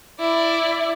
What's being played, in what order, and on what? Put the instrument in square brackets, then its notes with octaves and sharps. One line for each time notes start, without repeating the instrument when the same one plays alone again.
[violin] E4 D5